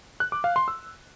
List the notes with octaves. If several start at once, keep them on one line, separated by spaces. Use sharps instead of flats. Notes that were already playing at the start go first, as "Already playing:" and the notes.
F#6
D6
F5
C6
E6